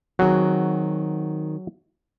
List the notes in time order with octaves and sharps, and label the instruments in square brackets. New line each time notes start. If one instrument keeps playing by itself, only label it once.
[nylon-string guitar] D#3 C4 [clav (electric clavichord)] F#3 F#4 G#4